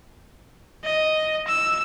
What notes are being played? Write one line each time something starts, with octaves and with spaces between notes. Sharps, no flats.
D#5
E6